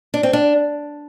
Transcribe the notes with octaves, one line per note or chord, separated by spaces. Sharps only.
D4
C4
D4